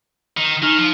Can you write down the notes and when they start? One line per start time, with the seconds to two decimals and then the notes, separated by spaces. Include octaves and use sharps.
0.37 D#3
0.62 D#3 D#4 F6
0.79 F3 F4